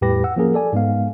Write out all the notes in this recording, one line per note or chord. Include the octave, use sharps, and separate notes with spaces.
E2 A2 G3 G4 B4 A#6
F#5 E6
F3 A#3 C#4 G#4 A#4
A4 D5 G#5
G#2 G#3 B3 F5